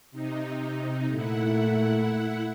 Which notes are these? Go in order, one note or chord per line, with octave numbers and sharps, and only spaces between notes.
C3 D#4
A#2 A3 E4 F#5